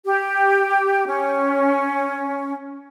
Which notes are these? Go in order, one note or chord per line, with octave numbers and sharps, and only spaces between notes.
G4
C#4